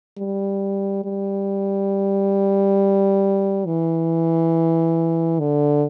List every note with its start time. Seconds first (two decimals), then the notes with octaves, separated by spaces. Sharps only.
0.18 G3
1.05 G3
3.66 E3
5.40 D3